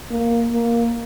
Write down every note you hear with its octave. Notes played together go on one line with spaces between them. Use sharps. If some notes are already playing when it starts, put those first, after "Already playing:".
A#3
A#3